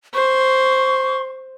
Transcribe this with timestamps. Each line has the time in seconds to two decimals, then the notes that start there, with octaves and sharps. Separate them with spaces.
0.14 C5 C#6